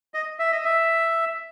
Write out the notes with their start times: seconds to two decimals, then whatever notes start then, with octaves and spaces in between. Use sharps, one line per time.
0.14 D#5
0.39 E5
0.52 D#5
0.64 E5